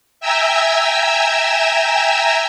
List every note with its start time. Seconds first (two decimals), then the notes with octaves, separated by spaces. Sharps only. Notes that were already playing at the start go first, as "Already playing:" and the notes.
0.20 E5 G5 G#5 A#5 E6